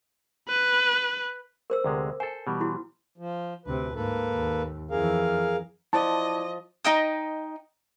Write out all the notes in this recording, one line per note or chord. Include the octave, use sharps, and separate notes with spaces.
B4
A#4 C5 E6
D2 C3 G#3
A4 C5 G#5
B2 E3 G3
E4 F#4
F3
D2 C3 B4
G#2 A#3 A4 B4
D#2
F2 E3 G#4 A#4 F5
F3 E4 D5 D#5 A5 D6
D#4 D#5 G5 D#6